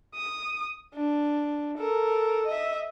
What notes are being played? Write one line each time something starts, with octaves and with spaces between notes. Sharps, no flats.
D#6
D4
A4 A#4
D#5 E5